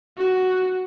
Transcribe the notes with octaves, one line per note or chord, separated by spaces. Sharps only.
F#4